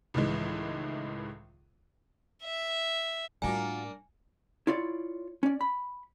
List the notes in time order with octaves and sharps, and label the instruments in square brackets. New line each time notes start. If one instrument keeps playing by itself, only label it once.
[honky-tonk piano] C#2 A2 D#3 E3 G#3
[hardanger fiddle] E5
[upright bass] A2 G3 [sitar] A#3 D4 [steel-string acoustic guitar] F4 F#4 A#4 [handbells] G#5
[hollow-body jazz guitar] E4 F4 C#5 D5
C#4 D5
B5